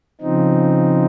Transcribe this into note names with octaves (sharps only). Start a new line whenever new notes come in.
C#3 F3 C4 D#4